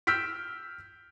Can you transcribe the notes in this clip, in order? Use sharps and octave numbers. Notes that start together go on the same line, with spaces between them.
E6 F6 G6 B6 D7